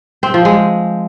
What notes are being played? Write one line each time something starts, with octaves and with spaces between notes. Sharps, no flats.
C4
F3
G#3